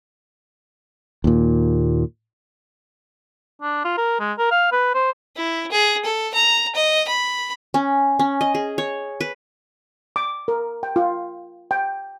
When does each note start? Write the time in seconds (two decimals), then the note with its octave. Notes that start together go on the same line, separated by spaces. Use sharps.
1.24 D#2 A#2
3.62 D4
3.84 F4
3.98 A#4
4.20 G#3
4.38 A#4
4.51 F5
4.72 B4
4.94 C5
5.36 E4
5.71 G#4
6.04 A4
6.34 A#5
6.75 D#5
7.08 B5
7.74 C#4
8.19 C#4
8.41 D#5
8.55 G#4
8.78 C#5
9.21 B4
10.16 D6
10.48 A#4
10.83 G5
10.96 F4
11.71 G5